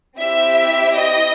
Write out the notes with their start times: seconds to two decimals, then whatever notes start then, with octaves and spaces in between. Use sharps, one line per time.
0.19 C4 E4 G4 E5
0.95 D#5